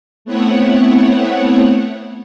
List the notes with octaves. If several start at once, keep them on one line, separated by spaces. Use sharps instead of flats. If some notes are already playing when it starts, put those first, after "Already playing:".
A3 B3 C4 E4 C#5 F#5